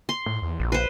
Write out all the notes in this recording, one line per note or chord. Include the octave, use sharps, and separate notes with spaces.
C6
A2
E2
A#1
B4 C5